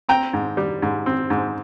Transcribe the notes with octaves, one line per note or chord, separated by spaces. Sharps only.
C4 G5 A#5
G#2
G3
G#2
C4
G#2